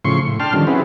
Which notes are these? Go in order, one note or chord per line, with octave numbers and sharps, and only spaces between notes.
A2 C#3 F3 C6 C#6
A2
D4 G5 A5 C6 F6
D3 D#3 F3 G3 C#4
C4 C#4 E4 F#4 G#4 B4